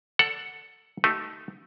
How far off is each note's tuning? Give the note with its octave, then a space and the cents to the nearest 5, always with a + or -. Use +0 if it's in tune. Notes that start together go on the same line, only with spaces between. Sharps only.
A4 +10 D5 -30 F#5 +0
A3 +0 D#4 +0 G4 -40